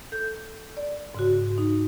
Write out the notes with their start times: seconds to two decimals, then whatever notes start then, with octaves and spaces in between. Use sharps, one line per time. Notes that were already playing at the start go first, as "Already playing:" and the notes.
0.12 A4 G6
0.77 D5
1.15 G#2 C#3 F#4
1.58 D#4